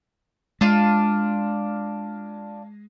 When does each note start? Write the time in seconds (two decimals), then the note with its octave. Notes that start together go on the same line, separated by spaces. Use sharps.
0.61 G#3 D4 F4